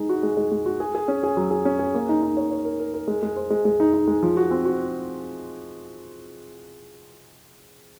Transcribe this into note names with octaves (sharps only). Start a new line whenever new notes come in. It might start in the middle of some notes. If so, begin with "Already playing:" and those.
Already playing: G#3 D#4
F#4
G#3
G#3
G#3
F#4
G#4
G#4
C#4
G#4
F#3
G#4
C#4
G#4
A#3
D#4
D#4
C#5
C#5
A#4
A#4
A#4
G#3
G#3
C5
G#3
G#3
D#4
D#4
G#3
F3
F#4
C4
F#4